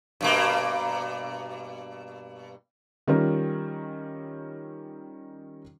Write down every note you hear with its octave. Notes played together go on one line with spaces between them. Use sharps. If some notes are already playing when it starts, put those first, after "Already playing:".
G2 B2 A#3
D#3 G3 C#4 F4 A#4